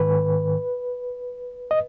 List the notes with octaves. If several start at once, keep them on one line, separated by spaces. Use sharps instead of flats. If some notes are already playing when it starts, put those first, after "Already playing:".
Already playing: G#2 D#3 B4
D#5